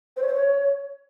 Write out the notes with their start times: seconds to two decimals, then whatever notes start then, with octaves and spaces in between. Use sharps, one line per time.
0.17 C5
0.22 C#5
0.28 C5
0.33 C#5